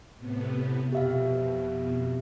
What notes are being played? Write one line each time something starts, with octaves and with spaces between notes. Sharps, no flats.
A2 C3 B3
F2 B2 G4 E5 F5